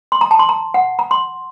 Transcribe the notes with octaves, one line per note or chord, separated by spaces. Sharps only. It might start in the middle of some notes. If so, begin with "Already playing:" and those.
C6
A#5
A5
C6
A#5
F#5
A#5
C6